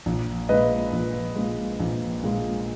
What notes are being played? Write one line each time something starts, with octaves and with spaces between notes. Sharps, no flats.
A#1
A#2 G#3 B4 D#5
A#1
A#2 G#3
A#1
A#2 G#3